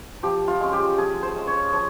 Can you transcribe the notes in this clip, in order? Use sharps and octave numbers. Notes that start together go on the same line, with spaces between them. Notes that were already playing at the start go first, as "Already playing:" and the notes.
F3 G4
F4
G#3 C#4
G4
F3 G#4
C5
G#3 C#4
C#5
F3 C#5